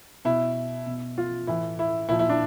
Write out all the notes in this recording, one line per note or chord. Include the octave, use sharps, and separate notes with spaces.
B2 E4
B2
F4
A2 E3 E4
E4
A#2 F3 E4
E4
D4